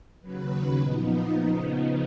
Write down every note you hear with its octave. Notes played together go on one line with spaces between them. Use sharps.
D#2 C#3 F#3 B4
A#2 F3 B3 D#4
C#3 F3 B3